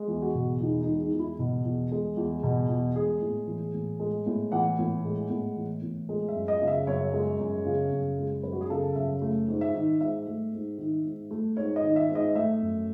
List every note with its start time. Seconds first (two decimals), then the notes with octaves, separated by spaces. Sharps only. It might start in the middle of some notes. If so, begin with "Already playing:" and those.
Already playing: G#3
0.08 E2
0.22 F#4
0.35 B2
0.60 E2 D#4
0.81 D#4
0.87 G#3
1.00 D#4
1.13 E2
1.19 E4
1.39 B2
1.65 E2
1.91 G#3
2.17 E2
2.43 B2
2.70 E2
2.96 G#3 G#4
3.21 A2
3.47 E3
3.74 A2
4.00 G#3
4.26 A2
4.52 E3 F#5
4.79 A2
5.04 G#3
5.30 A2
5.57 E3
5.82 A2
6.09 G#3
6.29 E5
6.35 F#2
6.48 D#5
6.62 C#3
6.67 E5
6.87 F#2 C#5
7.13 G#3
7.39 F#2
7.66 C#3
7.92 F#2
8.18 G#3
8.43 F#2 B4
8.53 F#4
8.61 G#4
8.70 C#3 A4
8.96 F#2 E5
9.22 A3
9.48 G#2
9.61 E5
9.74 D#3
10.00 G#2 E5
10.27 A3
10.53 G#2
10.78 D#3
11.05 G#2
11.31 A3
11.57 G#2 C#5
11.76 D#5
11.83 D#3
11.96 E5
12.09 G#2
12.15 D#5
12.35 A3 E5
12.61 F#2